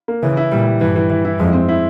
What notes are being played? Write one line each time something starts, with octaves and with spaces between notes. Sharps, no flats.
A#3
C#3 E3
E4
A#2 G3
G3
G2 E3
E3
E3
E4
F2 G#3
C4
E4